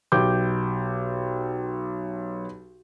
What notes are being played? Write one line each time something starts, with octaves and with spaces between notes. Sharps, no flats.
B1 G4 D6 G6